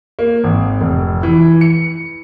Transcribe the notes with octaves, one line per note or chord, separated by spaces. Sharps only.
A#3
G#1
F1
E3
C#7